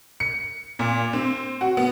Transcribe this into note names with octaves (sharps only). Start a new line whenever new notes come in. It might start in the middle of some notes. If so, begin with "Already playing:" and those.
C#7
A#2
C4
F#4
B3